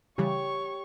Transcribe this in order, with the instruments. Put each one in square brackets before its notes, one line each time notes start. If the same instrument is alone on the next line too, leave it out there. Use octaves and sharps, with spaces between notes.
[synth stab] C#3 E3 G3 [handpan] G4 [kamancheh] C#5 C#6